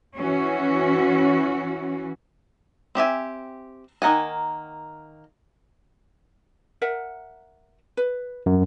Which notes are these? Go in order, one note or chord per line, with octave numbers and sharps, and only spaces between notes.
E3 C#4 F#4
C4 G4 E5 G#5
D#3 A#3 F#5 G#5
A#4 E5 F#5
B4
F#2